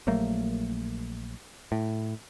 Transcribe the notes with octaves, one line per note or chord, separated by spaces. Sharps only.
A#1 F#3 A3 A#3
A2